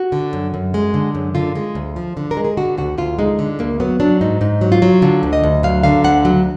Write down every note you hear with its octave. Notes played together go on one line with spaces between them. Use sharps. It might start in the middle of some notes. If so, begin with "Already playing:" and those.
Already playing: F#4
D3
F#2
F#2
G#3
D3
F#2
D3 F4
G#3
D2
F3
D3
A#4
G#3
G#4
D3 F#4
D2 F#4
D2 F4
G#3 D#4
D3
D2 A#3
F#3 B3
F#3 D4
G#2 D#4
G#2 D#4
F#3
F4
F#3
D3 F4
D2
D#5
D2
F#3 F5
D3 F5
D2 F#5
F#3